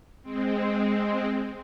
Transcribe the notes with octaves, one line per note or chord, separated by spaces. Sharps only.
G#3 C4